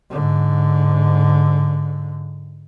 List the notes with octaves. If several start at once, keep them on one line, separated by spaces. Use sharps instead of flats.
G#2 D3